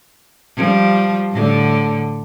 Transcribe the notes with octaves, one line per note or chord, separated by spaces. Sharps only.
F3 G3
A2 D3